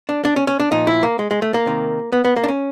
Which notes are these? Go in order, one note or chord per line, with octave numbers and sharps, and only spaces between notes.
D4
D4
C#4
C#4
D4
A#2 F3 D#4
E4
A#3
G#3
G#3
A3
A#3
C3 D#3
B3
B3
A#3
D4
C#4